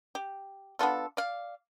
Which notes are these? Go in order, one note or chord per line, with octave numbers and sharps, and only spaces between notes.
G4
B3 D4 F4 A4
D5 F5